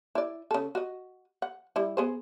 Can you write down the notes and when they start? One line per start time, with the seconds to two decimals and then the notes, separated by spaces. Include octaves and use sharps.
0.15 E4 D5
0.51 C#3 A4
0.75 F#4 D#5
1.42 F#5
1.76 G3 E4
1.97 B3 G#4 C5